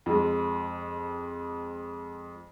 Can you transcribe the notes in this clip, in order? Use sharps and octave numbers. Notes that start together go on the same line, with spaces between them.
F2 G#3